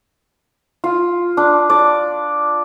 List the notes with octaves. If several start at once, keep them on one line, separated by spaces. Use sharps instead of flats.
F4
D4
D5